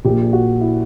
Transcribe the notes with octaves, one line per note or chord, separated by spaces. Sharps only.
A#1 A#2 G4
F#4
E4